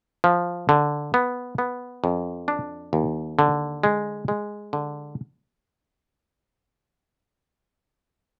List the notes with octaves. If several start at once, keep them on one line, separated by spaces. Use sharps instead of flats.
F3
D3
B3
B3
F2
D4
D#2
D3
G#3
G#3
D3